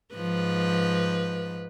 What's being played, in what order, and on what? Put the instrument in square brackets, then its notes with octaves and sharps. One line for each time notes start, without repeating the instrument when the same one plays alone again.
[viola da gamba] G#2 F3 B4